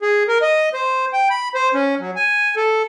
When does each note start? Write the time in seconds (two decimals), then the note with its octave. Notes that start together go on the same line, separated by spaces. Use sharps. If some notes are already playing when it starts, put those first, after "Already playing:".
0.02 G#4
0.28 A#4
0.42 D#5
0.74 C5
1.13 G5
1.30 B5
1.55 C5
1.74 C#4
2.00 F#3
2.16 G#5
2.56 A4